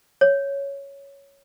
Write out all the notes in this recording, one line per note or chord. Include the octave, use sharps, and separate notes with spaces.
C#5